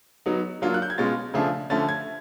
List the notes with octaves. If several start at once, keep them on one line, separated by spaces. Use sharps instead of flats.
F#3 B3 D#4
F#3 A#3 D4 F4
F#6
G6
G#6
B2 G#3 C#4 F4 A6
C#3 F3 A3 D4 F4
D3 F3 A3 C#4 A6
G#6